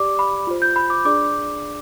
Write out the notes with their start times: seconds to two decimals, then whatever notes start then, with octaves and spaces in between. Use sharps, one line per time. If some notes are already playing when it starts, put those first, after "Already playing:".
Already playing: G4 D5 D6
0.19 B5
0.47 F4 C5
0.62 G6
0.76 B5
0.90 D6
1.05 D4 G#4 D5 D6